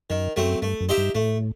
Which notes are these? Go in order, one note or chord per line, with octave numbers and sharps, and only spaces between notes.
F#2 D#3
F#2 F#3 A3 C4
G2 A3
F#2
D#4 G4 C5 E5
G2
A2 A3